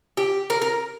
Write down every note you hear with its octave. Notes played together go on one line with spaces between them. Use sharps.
G4
A#4
A#4